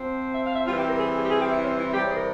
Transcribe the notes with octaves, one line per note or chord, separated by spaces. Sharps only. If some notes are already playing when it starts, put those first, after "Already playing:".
Already playing: F3 C4
E5
F5
E5
E3 G3 C4 F4
G4
A#4
G#4
G#4
G4
G#4
G4
E4
C#4
E4
C3 E3 G3 G4
C#5
G#4
A#4